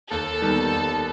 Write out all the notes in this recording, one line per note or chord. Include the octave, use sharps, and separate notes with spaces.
D#2 A4
D#3 G3 B3
D#2